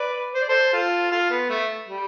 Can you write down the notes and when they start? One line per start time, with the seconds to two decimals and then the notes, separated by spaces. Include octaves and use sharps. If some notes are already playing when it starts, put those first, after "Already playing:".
Already playing: B4 D5
0.34 C5
0.42 D5
0.49 A4 C5
0.73 F4 A4
1.11 F4 A4
1.31 B3
1.50 A3
1.88 G3